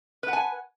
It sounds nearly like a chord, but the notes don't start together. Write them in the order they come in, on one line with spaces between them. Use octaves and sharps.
B4 F#5 G#5